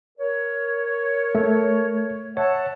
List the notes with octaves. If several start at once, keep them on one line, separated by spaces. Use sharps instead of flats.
A#4 C#5
A3
C#5 E5 F#5 A5